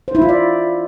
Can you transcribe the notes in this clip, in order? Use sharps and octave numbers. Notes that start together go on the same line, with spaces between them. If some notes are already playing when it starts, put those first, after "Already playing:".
C5
E4
F4
D5